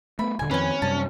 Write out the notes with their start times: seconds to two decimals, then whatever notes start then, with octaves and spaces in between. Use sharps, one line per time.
0.19 A3 B3 B5
0.39 D#1 D3 G#5
0.51 F2 D#3 C4 C#4 B4 G#5
0.82 F#2 C3 G3 A5